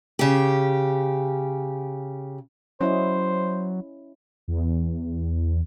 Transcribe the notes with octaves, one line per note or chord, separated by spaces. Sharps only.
C#3 G4
F#3 C#4 E4 C5 D#5
E2